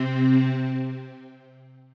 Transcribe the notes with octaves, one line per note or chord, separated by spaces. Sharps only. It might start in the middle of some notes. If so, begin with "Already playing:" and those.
Already playing: C3 C4